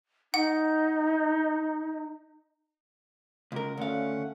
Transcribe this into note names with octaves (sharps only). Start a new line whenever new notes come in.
D#4 F#5
C#2 A#4
D2 A3 C#4 F5 F#5